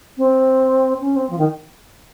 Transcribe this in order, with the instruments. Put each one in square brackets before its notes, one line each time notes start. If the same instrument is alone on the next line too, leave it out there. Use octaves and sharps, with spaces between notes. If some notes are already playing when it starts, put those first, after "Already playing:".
[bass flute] C4
C#4
C4
F3
D#3